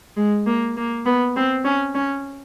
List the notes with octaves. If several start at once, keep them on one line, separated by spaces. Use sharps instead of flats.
G#3
A#3
A#3
B3
C4
C#4
C#4